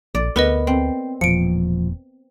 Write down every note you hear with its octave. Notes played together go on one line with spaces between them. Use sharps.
A#1 D5
D2 B3 A#4 B4 D#5
C4
E1 E2 A#2 F3 C#7 D7